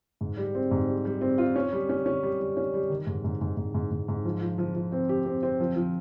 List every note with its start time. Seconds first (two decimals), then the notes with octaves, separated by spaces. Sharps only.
0.21 G#2
0.37 G3
0.55 C4
0.71 G#2
0.88 G3
1.05 G3
1.21 C4
1.38 F4
1.56 C#4
1.73 G3
1.89 C#4
2.06 C#4
2.23 G3
2.40 G3
2.57 C#4
2.74 G3
2.90 D#3
3.07 G#2
3.24 G#2
3.41 G#2
3.57 G#2
3.74 G#2
3.91 G#2
4.08 G#2
4.25 F3
4.42 F3
4.58 F3
4.75 F3
4.92 C4
5.09 G4
5.25 C4
5.43 C4
5.60 F3
5.76 F3